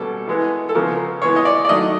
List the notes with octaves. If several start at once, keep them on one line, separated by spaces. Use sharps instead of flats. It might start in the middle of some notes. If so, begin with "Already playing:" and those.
Already playing: B2 G3 A#3 C#4 A4
E3 G#3 B3
A4
C#3 F3 G#3 B3 A#4
E3 G#3 B3 C#5
D#5
D5
D5
D#3 F#3 A3 D#5